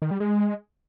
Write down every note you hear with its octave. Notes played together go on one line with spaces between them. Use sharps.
D#3
G3
G#3